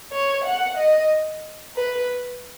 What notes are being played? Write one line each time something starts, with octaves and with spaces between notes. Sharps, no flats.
C#5
F#5
D#5
B4